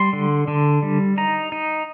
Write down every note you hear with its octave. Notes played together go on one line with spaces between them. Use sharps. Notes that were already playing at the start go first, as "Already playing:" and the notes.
Already playing: G3 C6
D3
D3
G3
D#4 A#5
D#4